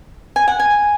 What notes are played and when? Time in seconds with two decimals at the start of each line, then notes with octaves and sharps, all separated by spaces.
0.36 G#5
0.48 F#5
0.60 G#5